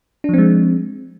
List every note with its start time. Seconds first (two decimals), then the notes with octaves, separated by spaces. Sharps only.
0.24 D4
0.29 F3
0.34 C4
0.38 G#3